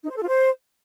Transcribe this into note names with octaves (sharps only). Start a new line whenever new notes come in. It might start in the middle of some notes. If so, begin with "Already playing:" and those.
D#4
C5
A4
F4
C5